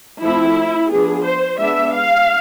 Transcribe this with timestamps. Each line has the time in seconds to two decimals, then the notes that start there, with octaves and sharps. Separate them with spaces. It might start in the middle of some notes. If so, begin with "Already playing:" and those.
0.22 F3 A3 C4 E4
0.90 F3 B3 D4 G#4
1.25 C5
1.59 G#3 B3 D4 E5
1.94 F5